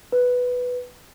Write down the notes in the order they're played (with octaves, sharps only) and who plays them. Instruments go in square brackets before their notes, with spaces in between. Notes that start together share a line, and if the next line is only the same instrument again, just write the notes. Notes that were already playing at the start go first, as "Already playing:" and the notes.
[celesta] B4